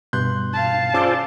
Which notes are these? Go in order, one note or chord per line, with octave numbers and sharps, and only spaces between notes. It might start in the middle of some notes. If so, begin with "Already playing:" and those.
G2 B2 C6 F#6 G6
F5 A5
C#4 F4 G#4 C5 D5 D6 E6